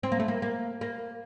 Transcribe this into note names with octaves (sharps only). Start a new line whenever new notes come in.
C4
A#3
A3
A#3
A#3
A#3